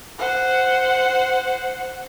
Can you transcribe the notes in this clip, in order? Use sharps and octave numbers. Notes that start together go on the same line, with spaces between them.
C5 F#5